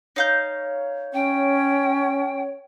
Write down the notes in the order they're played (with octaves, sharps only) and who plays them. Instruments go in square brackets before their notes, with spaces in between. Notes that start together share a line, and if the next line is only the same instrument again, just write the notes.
[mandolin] D#4 F5 G6 [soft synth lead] C#5
[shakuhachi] C#4 [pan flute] G5